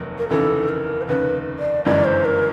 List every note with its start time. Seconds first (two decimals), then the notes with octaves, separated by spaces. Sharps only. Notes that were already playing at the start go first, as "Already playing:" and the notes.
Already playing: F1 D#2 F#3 A#3
0.18 A#4
0.29 F1 D#2 C#3 E3 A4
0.69 A#4
1.01 C5
1.07 F1 D#2 C#3 B4
1.59 D5
1.85 G1 F#2 C#3 E3 G#3 D5
2.05 C5
2.25 A#4